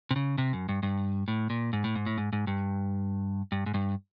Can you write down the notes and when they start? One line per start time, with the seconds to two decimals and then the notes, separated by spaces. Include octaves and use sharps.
0.11 C3
0.16 C#3
0.38 C3
0.53 F#2
0.69 G2
0.83 G2
1.28 A2
1.50 A#2
1.73 G#2
1.84 A2
1.95 G#2
2.06 A2
2.18 G#2
2.33 G#2
2.47 G2
3.52 G2
3.66 G#2
3.74 G2